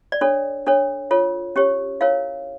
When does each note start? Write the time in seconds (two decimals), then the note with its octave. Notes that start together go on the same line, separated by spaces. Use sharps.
0.12 D5
0.21 D4 A4 C#5
0.66 D4 A4 C#5
1.11 F4 A4 C#5
1.56 C#4 G4 C#5
2.01 E4 A#4 C#5 F5